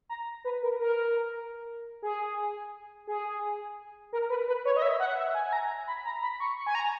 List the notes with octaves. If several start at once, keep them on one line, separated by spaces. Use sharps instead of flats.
A#5
B4
A#4
A#4
G#4
G#4
A#4
B4
B4
C#5
D#5
E5
F#5
E5
G#5
G#5
A#5
B5
A#5
B5
C#6
C#6
G#5
A#5